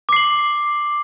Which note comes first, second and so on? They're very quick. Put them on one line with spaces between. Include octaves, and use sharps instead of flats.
D6 C7 F#7